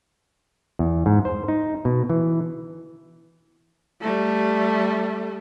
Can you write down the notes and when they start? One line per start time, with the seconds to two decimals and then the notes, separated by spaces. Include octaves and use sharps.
0.79 E2
1.06 G#2
1.25 C5
1.48 D#4
1.85 B2
2.10 E3
4.01 G3 A3